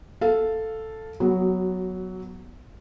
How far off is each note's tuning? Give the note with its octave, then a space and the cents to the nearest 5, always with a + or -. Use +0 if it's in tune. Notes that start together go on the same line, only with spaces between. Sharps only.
A4 +0 F5 +0
F#3 +0 B3 +0 F#4 +25